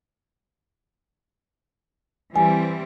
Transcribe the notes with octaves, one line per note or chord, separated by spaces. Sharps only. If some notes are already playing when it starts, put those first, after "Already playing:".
E3 G3 C4 G#5